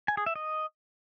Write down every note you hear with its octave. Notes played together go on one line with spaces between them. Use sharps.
G#5
G#4
E5
D#5